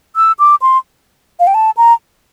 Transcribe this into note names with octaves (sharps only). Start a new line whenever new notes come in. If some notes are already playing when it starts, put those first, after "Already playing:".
E6
D6
C6
F5
G5
A5
A#5